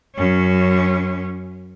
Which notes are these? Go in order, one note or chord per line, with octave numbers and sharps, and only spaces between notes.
F#2 C#4